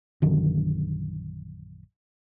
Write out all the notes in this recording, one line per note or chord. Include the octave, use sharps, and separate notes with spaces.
A#1 F#2 D3 D#3